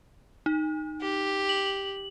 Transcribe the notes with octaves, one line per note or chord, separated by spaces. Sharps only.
D#4
G4
F#7